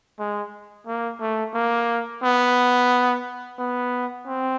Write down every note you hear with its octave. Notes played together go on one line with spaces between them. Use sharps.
G#3
A#3
A3
A#3
B3
B3
C4